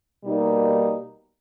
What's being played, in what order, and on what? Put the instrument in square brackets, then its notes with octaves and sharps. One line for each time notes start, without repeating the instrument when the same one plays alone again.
[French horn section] B2 G3 A#3 D#4